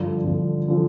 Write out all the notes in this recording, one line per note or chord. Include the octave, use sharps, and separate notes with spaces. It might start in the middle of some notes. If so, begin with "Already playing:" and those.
Already playing: G2 D3 F3
G2 D3 F3
D3 F3